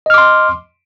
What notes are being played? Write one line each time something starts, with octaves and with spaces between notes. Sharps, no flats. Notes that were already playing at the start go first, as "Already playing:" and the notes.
D#5 C6 D6 F6